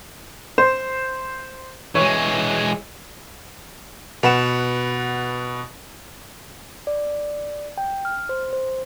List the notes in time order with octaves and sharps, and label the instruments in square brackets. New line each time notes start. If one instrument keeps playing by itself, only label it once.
[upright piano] C5
[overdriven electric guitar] E3 G#3 [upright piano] C#5
[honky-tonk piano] B2 B4 F#5 E7
[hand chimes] D5
G5
F6
C5
C5